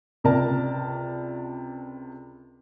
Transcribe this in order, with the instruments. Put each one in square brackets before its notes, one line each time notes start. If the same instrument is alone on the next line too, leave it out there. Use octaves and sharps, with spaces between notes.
[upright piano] C#2 C3 A#4 D5 A5